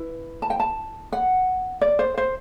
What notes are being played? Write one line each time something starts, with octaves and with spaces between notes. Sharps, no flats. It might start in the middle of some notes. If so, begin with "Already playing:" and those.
Already playing: E4 B4
A5
G5
A5
F#5
D5
C5
C5